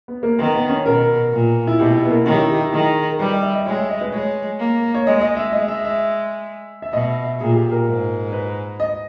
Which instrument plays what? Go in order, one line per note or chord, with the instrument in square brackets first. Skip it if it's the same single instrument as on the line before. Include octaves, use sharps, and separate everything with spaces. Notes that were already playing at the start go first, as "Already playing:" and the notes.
[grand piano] B3
A#3
[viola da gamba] D#3 [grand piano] B3
[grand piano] B3
C#4
[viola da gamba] B2 [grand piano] A#4
[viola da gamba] A#2
[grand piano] E4
[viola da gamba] B2 [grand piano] G4
[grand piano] E4
B3
A#3
[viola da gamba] D#3 [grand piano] C#4
[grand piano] G4
E4
G4
E4
[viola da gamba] D#3 [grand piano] G#4
[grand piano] A#4
[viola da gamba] G3 [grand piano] B4
[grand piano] D#5
E5
D#5
[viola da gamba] G#3 [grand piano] C#5
[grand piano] E5
D#5
B4
[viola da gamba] G#3 [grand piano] C#5
[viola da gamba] A#3
[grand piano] C#5
[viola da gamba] G#3 [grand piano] D#5
[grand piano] D#5
E5
[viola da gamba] G#3 [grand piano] D#5
[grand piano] E5
E5
E5
[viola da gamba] B2 [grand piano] D#5
[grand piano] E5
E5
[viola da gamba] A#2 [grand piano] G#4
[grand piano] G4
A#4
[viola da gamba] G#2
[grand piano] B4
D#5